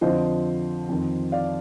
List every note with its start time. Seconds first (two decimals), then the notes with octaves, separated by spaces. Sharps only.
0.01 F2 D3 F3 C5 D#5
0.89 F2 D#3
1.32 D5 F5